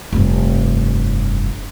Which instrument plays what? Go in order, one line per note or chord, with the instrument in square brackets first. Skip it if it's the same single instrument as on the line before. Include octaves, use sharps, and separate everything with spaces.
[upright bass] F1 G2